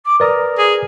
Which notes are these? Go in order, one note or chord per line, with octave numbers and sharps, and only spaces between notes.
D6
A#4 B4 D5 D#6
G#4